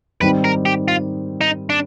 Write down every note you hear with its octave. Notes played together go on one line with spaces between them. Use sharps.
G#2 D#3 G3 C4 D#4 B4
A#4
G4
F4
D#4
D4